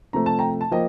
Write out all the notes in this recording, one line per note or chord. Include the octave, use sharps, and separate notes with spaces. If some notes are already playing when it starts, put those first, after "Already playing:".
C3 F3 A3 A#5
A5
G5 A#5
A5
F3 A#3 D#5 G5